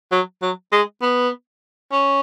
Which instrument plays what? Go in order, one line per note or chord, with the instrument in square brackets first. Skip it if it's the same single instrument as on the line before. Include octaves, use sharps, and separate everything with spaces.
[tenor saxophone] F#3
F#3
G#3
B3
C#4